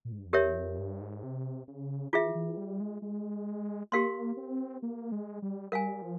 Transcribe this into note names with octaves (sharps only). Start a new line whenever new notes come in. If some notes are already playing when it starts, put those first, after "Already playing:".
A#2
G#2
G2
F2
E2 G4 A#4 C#5 E5
F2
G2
G#2
C3
C#3
E3 F4 G#4 E5
E3
G3
G#3
G#3
A#3 G4 A#4 F5 C6
C4
A#3
G#3
G3
G3 A#4 F5 G#5
F3